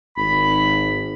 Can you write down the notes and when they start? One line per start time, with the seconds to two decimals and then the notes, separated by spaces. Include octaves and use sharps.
0.17 G#1 B5